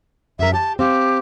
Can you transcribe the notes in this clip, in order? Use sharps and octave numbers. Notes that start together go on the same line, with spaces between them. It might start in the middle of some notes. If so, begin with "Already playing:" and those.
F#2 A#4 E5
G4 A5
C4 G4 F5